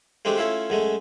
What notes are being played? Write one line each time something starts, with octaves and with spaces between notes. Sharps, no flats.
G#3 A3 C4 D4 G4
A3 C#4 E4 F4 E5
F#2 G#3 A3